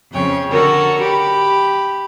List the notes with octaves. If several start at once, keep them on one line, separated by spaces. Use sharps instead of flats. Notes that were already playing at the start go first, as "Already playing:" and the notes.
F2 C#3 C#5 G5
D3 F#4 A4 A#4 C#5 C#6
G4 B5